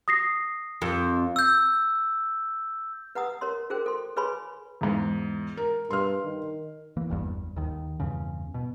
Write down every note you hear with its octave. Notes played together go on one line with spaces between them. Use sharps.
D#6 A#6 C7
F2
E6 G6
B4 F#5 A#5 D#6 E6
A#4 C#5 C6
F#4 G#4 A#4 C5 G5
A4 C6
G#4 B4 C#5 G#5 B5 C6
E2 G#2
A#4
G2 C6 F6
D#3
E3 A#3
G1 E2 G2
D#2 D#3
E2 G2 C#3
B2